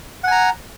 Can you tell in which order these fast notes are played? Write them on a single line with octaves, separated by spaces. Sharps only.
F#5 G#5 A#5